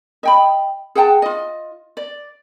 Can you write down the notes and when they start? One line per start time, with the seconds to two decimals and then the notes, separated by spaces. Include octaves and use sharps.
0.23 D#5 G5 B5
0.95 G#4 F#5 G5 A5
1.22 F4 D#5
1.97 D5